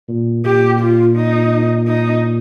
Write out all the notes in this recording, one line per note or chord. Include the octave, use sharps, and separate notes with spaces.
A#2
A#2 G4
F4
D#4
D#4